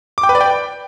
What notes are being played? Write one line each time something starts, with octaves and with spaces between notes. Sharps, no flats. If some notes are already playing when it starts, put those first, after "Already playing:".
D6
G5
B4
D5
G5